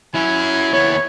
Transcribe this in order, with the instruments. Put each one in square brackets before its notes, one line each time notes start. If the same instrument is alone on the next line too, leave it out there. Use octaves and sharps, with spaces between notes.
[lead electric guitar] F#3 C#4 [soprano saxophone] E4 [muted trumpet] G#5
[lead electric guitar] D#2 B3 [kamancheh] C#5